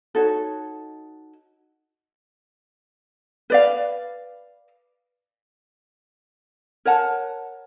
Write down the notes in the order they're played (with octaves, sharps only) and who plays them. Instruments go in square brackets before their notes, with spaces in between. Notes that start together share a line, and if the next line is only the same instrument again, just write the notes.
[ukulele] D#4 F#4 A4 C#5
B4 D5 F5
A#4 C#5 F#5 A5